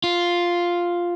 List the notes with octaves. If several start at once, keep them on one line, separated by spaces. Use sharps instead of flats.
F4